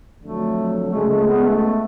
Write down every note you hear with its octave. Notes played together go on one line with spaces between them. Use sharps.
F2 D3 F#3 A3
C#2 C#3 G#3 A3
A3
B3
A3